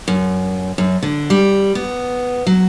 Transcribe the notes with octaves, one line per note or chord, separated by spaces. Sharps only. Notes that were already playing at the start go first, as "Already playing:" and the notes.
F#2
F#2
D3
G3
B3
F#3